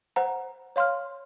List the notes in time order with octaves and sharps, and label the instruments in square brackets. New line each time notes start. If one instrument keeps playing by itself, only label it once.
[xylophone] C5 F#5 A#5
C#5 F5 C6 F6